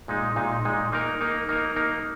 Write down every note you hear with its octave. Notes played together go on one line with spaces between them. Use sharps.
A#2 G#3 D#4
A#2 G#3 D#4
A#2 G#3 D#4
A#3 D#4 A#4
A#3 D#4 A#4
A#3 D#4 A#4
A#3 D#4 A#4